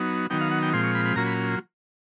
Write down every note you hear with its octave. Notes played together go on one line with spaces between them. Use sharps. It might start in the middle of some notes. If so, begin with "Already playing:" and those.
Already playing: F#3 B3 D#4
D#3 F#3 B3 D#4 G5
F5
F#5
G5
A#2 F3 G#3 C4 F4 C6
C#6
B5
B5
A#2 F#3 A#3 C#4 F4 A#5
B5